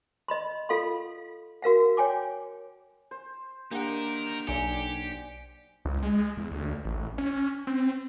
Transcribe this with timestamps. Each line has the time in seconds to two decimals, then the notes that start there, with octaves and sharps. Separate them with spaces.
0.28 D#5 B5 C6
0.69 F4 A4 F5 F#5 C6
1.62 F#4 A#4 F5 F#5
1.97 C#5 G5 G#5 D6
3.11 C5
3.71 A#3 D4 D#4 G4 A#4 F#5
4.48 B1 G4 D5 G#5 C#7
5.85 C#2
6.03 G#3
6.37 E2
6.51 D2
6.85 A1
7.18 C#4
7.67 C4